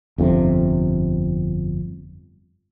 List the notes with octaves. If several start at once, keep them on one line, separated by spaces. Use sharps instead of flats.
G1 F2 A2 C3